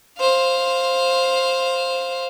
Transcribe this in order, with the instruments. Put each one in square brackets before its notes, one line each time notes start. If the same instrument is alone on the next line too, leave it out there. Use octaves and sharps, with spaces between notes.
[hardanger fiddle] C5 F5